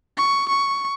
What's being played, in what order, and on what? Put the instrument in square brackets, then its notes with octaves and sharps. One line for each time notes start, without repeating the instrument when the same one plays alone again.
[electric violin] C#6
C#6